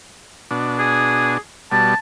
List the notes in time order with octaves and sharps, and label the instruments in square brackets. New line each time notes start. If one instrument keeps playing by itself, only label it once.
[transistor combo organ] B2 D4
[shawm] G#4
[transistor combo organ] B2 G3 [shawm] A5